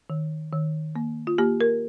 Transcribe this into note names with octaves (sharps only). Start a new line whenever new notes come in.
D#3
D#3
A#3
F4
A#3 G4
A#4